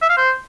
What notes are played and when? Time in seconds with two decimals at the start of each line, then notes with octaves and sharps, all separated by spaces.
0.02 E5
0.10 F5
0.17 C5